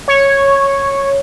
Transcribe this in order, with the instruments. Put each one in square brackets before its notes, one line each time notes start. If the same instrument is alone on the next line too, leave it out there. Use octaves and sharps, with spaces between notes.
[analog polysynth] C#5